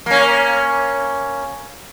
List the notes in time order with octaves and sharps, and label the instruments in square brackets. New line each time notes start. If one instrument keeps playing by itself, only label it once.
[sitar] A#3 C#4